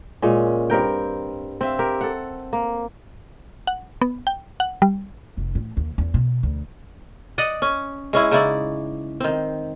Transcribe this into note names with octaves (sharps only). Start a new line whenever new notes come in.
A#2 G#3 C#4
G2 C4 A#4 G5
C4 E5 F5
G4 A#4
A4 F#5
A#3
F#5
B3
G5
F#5
G3
F1
A2
D#2
E2
B2
D2
D5 D#5 F#5
C#4
G#3 C#4 E4
C#3 D#4 E4 D5
D#3 C4